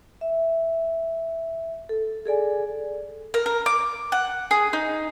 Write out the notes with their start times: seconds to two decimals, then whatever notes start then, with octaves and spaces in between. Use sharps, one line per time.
0.21 E5
1.89 A4
2.26 G#4 A4 D5 G#5
3.34 A#4
3.46 A#4
3.66 D6
4.12 F#5
4.51 G#4
4.73 D#4